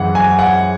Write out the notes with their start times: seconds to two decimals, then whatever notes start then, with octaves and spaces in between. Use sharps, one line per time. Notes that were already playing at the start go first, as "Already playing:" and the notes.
Already playing: F#2 E3 G#3 F#5
0.15 G#5
0.39 F#5